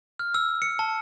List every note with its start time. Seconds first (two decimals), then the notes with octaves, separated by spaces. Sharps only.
0.19 F6
0.34 E6
0.62 C#7
0.79 A5